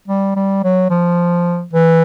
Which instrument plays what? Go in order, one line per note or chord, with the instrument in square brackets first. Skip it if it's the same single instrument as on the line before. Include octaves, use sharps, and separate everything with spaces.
[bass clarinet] G3
G3
F#3
F3
E3